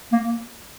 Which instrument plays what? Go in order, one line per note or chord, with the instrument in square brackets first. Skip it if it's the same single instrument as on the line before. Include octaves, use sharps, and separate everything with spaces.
[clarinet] A#3